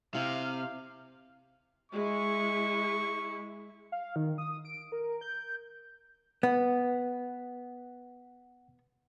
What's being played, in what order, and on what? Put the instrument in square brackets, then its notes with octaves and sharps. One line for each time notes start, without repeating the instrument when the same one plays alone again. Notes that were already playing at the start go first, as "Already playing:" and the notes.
[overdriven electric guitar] C3 [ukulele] E4 [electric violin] F5
[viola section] G#3 E4 [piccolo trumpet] C#6
[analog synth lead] F5
D#3
D#6
D7
A#4
G6
[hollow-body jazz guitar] B3 [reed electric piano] F#5